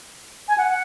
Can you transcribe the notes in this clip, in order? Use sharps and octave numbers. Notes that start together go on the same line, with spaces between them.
G#5
F#5
F#5